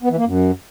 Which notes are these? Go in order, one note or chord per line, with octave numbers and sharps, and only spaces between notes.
B3
E3
A#3
F#2